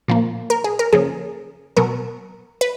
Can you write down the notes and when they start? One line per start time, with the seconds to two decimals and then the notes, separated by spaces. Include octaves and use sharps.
0.08 A#2 F3 A#3
0.50 A#4
0.64 G#4
0.79 A#4
0.93 C#3 F3 A#3 G#4
1.77 B2 F#3 B3 A#4
2.61 B4